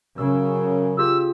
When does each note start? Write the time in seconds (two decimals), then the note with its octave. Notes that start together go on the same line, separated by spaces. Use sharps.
0.18 F#2 C#3 E6
0.97 F4 G4 G#4 E6